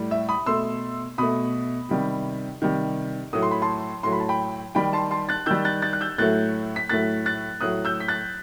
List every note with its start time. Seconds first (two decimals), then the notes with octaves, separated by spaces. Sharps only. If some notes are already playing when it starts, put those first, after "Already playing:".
Already playing: A2 G3
0.11 E5
0.29 B5 D#6
0.46 B2 A3 C6 E6
1.18 B2 A3 B5 D#6
1.89 C3 D#3 G3
2.62 C3 D#3 G3
3.33 A2 F#3 A3 D#6
3.42 C6
3.51 B5
3.62 A5 C6
4.03 A2 F#3 A3 C6
4.12 B5
4.20 A5
4.29 G5 B5
4.75 D#3 G3 G5 B5
4.93 A5 C6
5.11 A5 C6
5.29 F#6 A6
5.46 D#3 G3 E6 G6
5.65 F#6 A6
5.82 F#6 A6
5.93 F#6
6.01 E6 G6
6.18 A2 F#3 A3 F#6 A6
6.76 B6
6.89 A2 F#3 A3 F#6 A6
7.26 F#6 A6
7.61 A2 F#3 A3 D#6 F#6
7.85 E6 G6
8.00 B6
8.08 F#6 A6